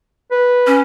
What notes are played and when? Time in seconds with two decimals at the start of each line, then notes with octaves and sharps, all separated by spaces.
0.31 B4
0.67 C#4